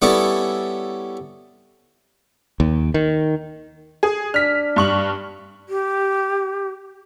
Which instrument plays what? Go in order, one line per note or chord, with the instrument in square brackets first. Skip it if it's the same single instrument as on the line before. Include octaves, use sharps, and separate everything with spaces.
[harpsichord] G3 B3 C#4 E4 A4
[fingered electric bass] D#2
D#3
[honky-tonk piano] G#4
[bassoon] D4 [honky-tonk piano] F6 B6
[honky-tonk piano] G2 C#6 F#7
[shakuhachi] G4